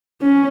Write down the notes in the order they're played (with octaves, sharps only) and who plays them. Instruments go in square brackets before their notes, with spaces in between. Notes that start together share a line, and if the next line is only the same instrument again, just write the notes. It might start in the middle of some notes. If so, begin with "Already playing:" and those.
[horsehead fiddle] C#4